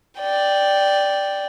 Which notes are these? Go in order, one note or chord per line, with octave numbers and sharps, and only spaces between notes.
D5 G5